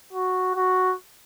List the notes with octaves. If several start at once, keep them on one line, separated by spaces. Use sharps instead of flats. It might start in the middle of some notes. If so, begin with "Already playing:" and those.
F#4
F#4